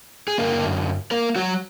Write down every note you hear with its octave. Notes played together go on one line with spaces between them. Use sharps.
G#4
F#2 D3 F#3 A#3 A#4
A#3 A#4
F#3 F#4